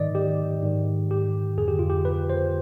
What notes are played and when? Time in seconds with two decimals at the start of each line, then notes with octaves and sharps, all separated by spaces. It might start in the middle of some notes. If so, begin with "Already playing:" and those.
Already playing: G#2 D#3 D5 D#5
0.15 G4
0.63 G#2 D#3
1.11 G4
1.58 F2 D3 G#4
1.68 G4
1.79 F4
1.90 G4
2.05 B4
2.30 C5